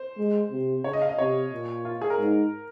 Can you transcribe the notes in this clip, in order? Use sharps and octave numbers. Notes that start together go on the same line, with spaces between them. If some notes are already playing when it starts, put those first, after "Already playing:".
Already playing: C5
G#3
C3
C#3 C#5
D#5
F5
D#5
C3 C#5
A#2
F4
G#4
A#4
G#2